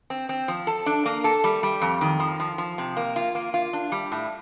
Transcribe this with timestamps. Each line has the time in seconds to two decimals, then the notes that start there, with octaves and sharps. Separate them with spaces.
0.10 C4
0.29 C4
0.48 F3
0.67 A4
0.86 D4
1.06 A#3
1.24 A4
1.44 G3
1.63 G3
1.81 F2
2.01 D#3
2.20 F3
2.40 F3
2.58 F3
2.78 C3
2.97 A#3
3.16 F4
3.35 A#3
3.54 F4
3.73 D4
3.92 G3
4.12 A2